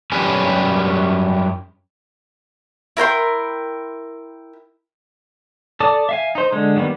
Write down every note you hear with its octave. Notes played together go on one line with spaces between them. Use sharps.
F#2 G3 C#4 G4 B4 G#5
E4 A#4 G5 C6
A4 D5 A5 D#6
E5 F5 G#5
D#4 C5
D3 G#3
D#3 G3 A#3 B3